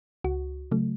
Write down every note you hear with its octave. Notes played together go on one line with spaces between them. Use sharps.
C#2 F#4
C#3 F#3 A3